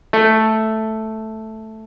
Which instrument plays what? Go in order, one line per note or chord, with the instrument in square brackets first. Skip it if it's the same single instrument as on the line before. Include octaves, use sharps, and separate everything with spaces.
[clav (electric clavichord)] A3